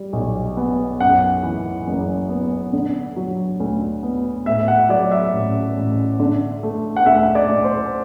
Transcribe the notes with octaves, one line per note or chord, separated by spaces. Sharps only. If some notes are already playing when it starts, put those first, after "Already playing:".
Already playing: G3
B1
B3
F#2 F#5
E3
F#1
B3
D3
F#3
D2
B3
A2 E5
F#5
F#3 D5
E5
A1
A1
D3
A3
F#5
D2 E5
D5
D2
C5